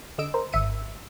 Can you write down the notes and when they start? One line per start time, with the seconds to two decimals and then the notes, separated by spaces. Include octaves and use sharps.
0.18 D3 D#5 E6 D7
0.34 A#4 C5
0.53 G#1 E5 C#7 D#7